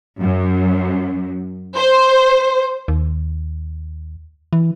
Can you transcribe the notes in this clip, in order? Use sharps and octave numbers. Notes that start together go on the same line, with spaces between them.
F#2
C5
D#2
E3